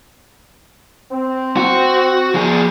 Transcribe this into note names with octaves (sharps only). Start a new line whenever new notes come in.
C4
F#4
F3 G#4